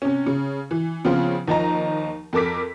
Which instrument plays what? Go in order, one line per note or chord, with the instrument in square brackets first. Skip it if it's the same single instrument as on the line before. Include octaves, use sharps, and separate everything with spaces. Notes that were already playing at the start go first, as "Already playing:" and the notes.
[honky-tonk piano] C3 C#4
C#3
E3
C#3 F3 B3 C4 F4
D#2 F3 D#4 A#5
F2 A4 A#4 D6 B6